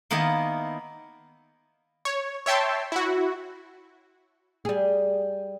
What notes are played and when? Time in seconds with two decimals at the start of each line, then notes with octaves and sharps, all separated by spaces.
0.11 D#3 A#3 B3 E4 D#5 F5
2.05 C#5
2.46 C#5 E5 G5 A5 C6
2.92 E4 F#4
4.65 G3 G#4